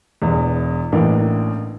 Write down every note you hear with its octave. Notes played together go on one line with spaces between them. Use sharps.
E1 E2 E3
A1 A2 E3 A#3 D4